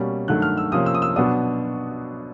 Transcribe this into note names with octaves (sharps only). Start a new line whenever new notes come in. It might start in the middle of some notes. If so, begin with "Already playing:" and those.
Already playing: B2 G3 A#3 C#4
G2 D#3 F#3 A3 F#6
F6
E6
C3 F3 A#3 C#4 D#6
E6
D#6
E6
B2 F#3 B3 D4 D#6